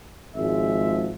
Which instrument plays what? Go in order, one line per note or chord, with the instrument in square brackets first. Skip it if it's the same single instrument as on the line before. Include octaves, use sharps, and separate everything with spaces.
[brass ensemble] G#1 F3 G#3 E5